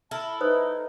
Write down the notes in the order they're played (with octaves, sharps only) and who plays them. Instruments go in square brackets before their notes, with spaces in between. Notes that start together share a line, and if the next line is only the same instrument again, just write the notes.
[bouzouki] E4 A4 A#4 [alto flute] A5
[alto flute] D#4 [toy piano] B4 C5 D#6